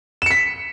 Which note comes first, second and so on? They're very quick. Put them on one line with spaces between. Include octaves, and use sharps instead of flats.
E7 C#7 B6